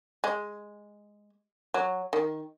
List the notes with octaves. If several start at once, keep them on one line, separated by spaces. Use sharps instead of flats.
G#3
F#3
D#3